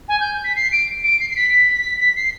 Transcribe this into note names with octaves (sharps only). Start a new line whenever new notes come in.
G#5
G6
B6
C7
D7
D7
C7
C7
B6
B6
C7